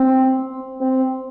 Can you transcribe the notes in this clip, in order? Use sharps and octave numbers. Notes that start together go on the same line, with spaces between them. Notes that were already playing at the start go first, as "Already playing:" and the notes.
Already playing: C4
C4